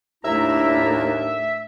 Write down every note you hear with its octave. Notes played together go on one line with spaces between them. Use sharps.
D#2 A2 A3 D4 E4 E5 A#5